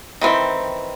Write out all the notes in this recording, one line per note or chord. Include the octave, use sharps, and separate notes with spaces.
D#3 E3 C4